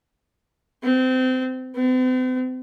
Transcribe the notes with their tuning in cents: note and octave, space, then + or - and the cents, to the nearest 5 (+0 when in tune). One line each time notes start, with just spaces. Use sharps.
C4 -25
C4 -45